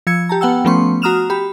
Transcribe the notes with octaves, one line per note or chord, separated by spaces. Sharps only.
F3 E6 G#6 C#7
G4 A5 A#5
B3 F#5 G5 E6
F3 A3 B3 C#4 C6 C#6
F#4 A#5 D#6 F6 E7 F7
G4 B5